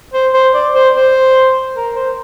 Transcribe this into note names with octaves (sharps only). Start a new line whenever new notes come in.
C5
C5
D5
C5
C5
A#4
C5